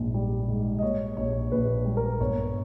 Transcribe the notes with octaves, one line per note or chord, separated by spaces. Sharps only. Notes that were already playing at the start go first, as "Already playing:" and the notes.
Already playing: A#1 G#2
G3
G#2
D#5
A#2 C#5
A#1 C#5
A#1 B4
G3
A#4
B4
G1 C#5